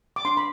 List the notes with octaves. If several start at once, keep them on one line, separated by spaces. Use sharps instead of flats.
D6
D4 C6
B5